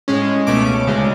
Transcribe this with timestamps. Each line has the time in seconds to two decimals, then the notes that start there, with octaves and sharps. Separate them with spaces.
0.08 A2 G#3 C#4
0.47 C#2 B2 A3 C#4 D6
0.87 D2 C#3 G#3